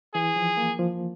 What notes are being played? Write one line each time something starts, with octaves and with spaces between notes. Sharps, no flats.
E3 G#4
F3
A#3
F3